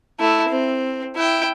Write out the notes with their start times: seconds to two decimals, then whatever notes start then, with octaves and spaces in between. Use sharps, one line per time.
0.19 A3 E4
0.50 C4
1.16 E4 G5